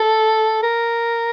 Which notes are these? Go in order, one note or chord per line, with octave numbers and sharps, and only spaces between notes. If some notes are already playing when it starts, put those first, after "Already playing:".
Already playing: A4
A#4